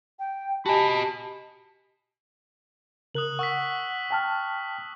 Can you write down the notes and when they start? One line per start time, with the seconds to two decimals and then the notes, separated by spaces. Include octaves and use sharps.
0.19 G5
0.66 F#4 G4 D#5 G#5 A5 B5
3.15 C#3 A#4 D#6 F#6 F#7
3.39 F#5 C#6 E6 B6
4.11 G5 A5 F6